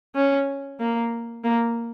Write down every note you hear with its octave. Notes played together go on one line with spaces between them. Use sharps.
C#4
A#3
A#3